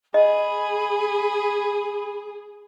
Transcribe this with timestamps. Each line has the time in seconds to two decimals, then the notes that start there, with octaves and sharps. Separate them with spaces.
0.14 G#4 D#5 G#5 B5